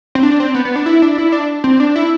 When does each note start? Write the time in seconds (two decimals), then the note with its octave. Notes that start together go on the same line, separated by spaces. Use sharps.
0.15 C4
0.23 D4
0.40 C4
0.54 B3
0.65 B3
0.76 D4
0.86 E4
1.02 D4
1.18 E4
1.32 D4
1.64 C4
1.80 D4
1.96 E4